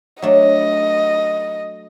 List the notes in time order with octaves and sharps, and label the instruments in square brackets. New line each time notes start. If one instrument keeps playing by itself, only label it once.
[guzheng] F#3 A3 D4 [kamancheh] D#5